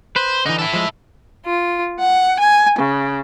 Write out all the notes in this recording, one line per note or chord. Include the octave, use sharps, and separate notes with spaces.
B4 C5
D3 E3 D#4
E4 A4
F3 G#3
F4
F#5
G#5
C#3